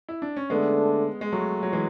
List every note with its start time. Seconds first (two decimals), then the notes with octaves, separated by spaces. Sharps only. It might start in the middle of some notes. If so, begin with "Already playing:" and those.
0.09 E4
0.22 D4
0.37 C#4
0.50 D3 G#3 A3 B3 D4 A4
1.21 G#3
1.32 F#3 A3
1.63 F#3
1.73 E3 G#3